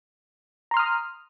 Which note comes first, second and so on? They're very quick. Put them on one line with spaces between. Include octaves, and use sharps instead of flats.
A#5 C6 F6 D#6